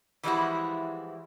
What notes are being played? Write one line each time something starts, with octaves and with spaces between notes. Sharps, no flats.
E3 F3 G3 G#3 E4 F#4